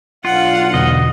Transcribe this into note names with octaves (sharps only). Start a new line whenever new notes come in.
B1 D4 F4 F5 F#5
E2 B2 D3 D#5